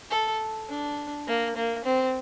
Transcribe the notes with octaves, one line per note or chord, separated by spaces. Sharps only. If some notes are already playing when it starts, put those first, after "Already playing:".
A4
D4
A#3
A#3
C4